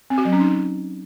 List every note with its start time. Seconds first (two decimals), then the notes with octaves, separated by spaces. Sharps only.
0.10 C4
0.18 F#4
0.25 F#3
0.33 C#4
0.40 D#4